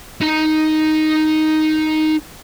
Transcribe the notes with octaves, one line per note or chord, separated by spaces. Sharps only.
D#4 A#5